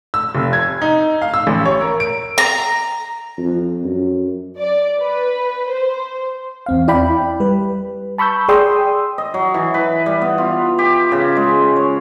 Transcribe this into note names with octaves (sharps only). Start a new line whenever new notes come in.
E6
F1
G#6
D#4
F5
E6
A1
C#5
A#4
D7
A#5
F2
F#2
D5
B4
C5
E2 C4 F5
E4 D5 G5 B5
G3 B4
A5 B5 C#6 E6 G6
G#4 D5 G5 C6 D#6 E6
D#5
F#3
E3
B4
G3
B3
F4
G4
C#3
G#3
C#5